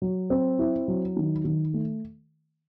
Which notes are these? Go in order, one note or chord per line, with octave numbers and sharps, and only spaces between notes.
F#3
C4
E4
F#3
D#3
D#3
A3